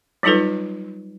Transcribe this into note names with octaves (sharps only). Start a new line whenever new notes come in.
F#3 G3 D#4 F4 A4 B4